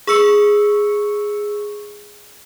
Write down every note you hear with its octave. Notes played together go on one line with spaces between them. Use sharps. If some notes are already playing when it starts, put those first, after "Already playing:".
G#4 C#6 E6 C#7